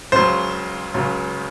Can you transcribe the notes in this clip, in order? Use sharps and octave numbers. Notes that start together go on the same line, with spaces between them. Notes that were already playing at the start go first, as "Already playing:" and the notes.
C#2 C#3 F#3 C5
C#2 C#3 F#3